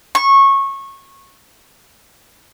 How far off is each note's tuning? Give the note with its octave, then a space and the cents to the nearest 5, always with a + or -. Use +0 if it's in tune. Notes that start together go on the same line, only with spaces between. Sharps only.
C#6 -20